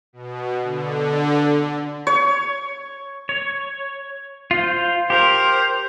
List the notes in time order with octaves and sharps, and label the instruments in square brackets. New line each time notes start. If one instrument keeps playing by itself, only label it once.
[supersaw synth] B2
D3
[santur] C#5
[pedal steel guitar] C#5
F4 C5
[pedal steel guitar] G4 A#4 [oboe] C5